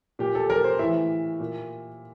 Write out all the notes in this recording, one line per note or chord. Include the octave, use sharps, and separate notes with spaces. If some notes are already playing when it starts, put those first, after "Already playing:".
A#2 G4
A4
A#4
C5
A2 E3 E5
A#2